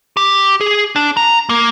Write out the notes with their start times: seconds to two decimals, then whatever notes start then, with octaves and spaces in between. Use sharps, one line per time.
0.17 G4
0.61 G#4
0.96 D4
1.17 A#5
1.49 A#3